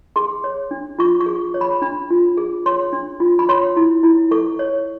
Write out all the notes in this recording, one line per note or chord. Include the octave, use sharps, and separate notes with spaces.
G#4 C6
C#5
D4
F4 C#6
C#6
G#4
C#5
B5
D4 B5
F4
G#4
C#5 C6
D4
F4
B5
C#5 C6
E4
E4
A4 C#6
C#5